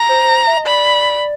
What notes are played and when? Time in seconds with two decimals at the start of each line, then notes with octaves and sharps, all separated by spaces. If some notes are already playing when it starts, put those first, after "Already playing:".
Already playing: A#5
0.09 C5
0.23 C5
0.47 E5
0.57 D#5
0.66 D5 B5